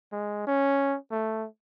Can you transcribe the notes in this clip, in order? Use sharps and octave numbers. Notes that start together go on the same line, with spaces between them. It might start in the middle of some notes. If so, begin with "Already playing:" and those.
G#3
C#4
A3